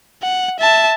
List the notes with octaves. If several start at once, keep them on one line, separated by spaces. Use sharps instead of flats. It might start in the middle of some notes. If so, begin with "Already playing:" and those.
F#5
E5 A5